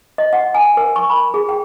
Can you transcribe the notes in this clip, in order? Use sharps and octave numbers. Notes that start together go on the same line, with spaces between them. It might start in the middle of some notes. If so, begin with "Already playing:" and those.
D#5
F#5
G#5
A#4
C#6
B5
G#4
G5